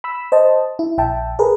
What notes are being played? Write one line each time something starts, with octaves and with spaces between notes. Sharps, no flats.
B5 E6
C5 D#5 A5
E4
A#1 E5 G5 A5
G#4 A#4 B4